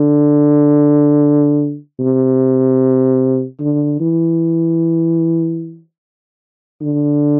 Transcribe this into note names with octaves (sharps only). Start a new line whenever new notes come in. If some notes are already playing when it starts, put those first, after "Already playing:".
Already playing: D3
C3
D3
E3
D3